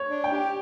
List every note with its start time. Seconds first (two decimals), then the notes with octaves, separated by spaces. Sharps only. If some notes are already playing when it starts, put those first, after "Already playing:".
Already playing: C#5
0.09 D4
0.24 G5
0.32 G4